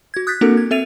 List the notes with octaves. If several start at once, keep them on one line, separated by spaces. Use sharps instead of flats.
F#4 G#6
D#6 F#6 G6 A6 B6
A#3 C4 D4 F#4 A4 A#4
G#6
C4 A4 E5 A6 D#7 F7